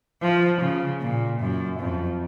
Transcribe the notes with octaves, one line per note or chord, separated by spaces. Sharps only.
F3
C#3
A#2
F#2
F2